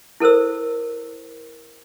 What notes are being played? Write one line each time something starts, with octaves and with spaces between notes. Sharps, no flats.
E4 A4 A#4 C5 E6